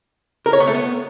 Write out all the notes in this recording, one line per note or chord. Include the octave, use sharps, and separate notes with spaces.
A#4
C#5
B3
A3
B3